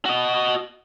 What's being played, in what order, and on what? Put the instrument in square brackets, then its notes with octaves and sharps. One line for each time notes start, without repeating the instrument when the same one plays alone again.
[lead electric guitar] F#4 D#5